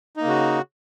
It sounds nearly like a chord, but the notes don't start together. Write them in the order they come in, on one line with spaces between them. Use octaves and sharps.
D#4 A#3 C#3 F#4